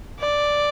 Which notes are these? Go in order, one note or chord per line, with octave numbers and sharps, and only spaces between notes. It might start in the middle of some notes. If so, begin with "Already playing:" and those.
D5